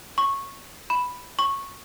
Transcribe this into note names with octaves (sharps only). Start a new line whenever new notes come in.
C#6
B5
C#6